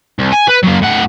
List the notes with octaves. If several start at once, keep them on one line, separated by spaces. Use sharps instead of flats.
C2
G#5
B4
F#3 A#3
A2 F#5